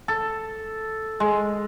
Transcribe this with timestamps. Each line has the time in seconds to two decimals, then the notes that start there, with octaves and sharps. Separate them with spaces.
0.08 A4
1.20 G#3